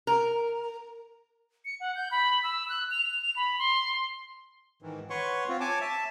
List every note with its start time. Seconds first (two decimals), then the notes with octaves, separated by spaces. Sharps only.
0.07 A#4
1.65 C#7
1.80 F#5
1.95 G6
2.11 B5
2.43 E6
2.69 F#6
2.91 F7
3.22 F7
3.36 B5
3.59 C6
4.82 G#2 D#3 E3
5.10 B4 C#5 F#5 C6 C#6
5.49 C4 F4
5.61 C#5 G#5 A5 D6
5.81 E5 A5